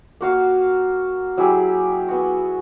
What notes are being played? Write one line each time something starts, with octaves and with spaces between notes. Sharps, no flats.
A#3 F#4 F5
F#3 E4 G4 G#4
B3 F#4